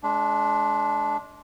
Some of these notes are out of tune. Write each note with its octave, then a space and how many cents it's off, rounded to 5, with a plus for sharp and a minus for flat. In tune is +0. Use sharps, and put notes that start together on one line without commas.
G#3 +25 D4 -15